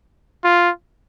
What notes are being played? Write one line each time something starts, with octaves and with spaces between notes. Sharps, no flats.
F4